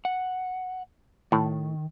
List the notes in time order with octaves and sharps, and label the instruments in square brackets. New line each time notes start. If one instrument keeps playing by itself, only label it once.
[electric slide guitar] F#5
[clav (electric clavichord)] A2 [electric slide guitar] D#3